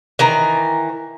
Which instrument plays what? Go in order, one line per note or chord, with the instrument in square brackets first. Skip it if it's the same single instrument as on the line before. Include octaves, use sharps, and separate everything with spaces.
[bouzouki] D#3 E3 A#5